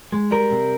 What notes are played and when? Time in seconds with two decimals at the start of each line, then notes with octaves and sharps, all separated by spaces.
0.12 G#3
0.31 G3 A#4
0.51 C3